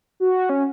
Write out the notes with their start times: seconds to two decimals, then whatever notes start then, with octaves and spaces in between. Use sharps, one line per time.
0.20 F#4
0.49 C#4